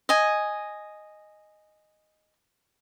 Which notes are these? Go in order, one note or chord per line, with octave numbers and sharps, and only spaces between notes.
D#5 G#5